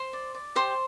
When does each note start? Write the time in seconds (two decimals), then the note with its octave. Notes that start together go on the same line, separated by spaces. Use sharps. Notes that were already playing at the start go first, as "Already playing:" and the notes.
Already playing: C5 C6
0.13 D5
0.34 D5
0.55 G4 C5 C6